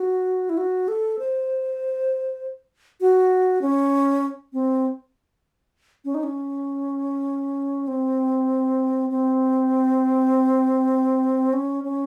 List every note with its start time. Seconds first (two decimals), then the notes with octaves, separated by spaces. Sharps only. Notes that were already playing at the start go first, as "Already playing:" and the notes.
Already playing: F#4
0.49 E4
0.57 F#4
0.88 A4
1.19 C5
3.01 F#4
3.61 C#4
4.53 C4
6.05 C#4
6.15 D#4
6.23 C#4
7.88 C4
9.10 C4
11.53 C#4
11.84 C#4